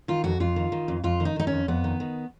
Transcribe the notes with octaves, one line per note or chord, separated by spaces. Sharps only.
D#3 F4
F2 F#4
F2 F4
D#3
D#3
F2
F2 F4
D#3
D#4
D#3 D#4
F2 C#4
F2 B3
D#3
D#3